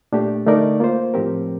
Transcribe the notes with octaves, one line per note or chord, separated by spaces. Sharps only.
A#2 A3 D4 G4
D3 A3 D#4 A#4 D5
A#3 F4 C5
A2 F3 C4 G4 A#4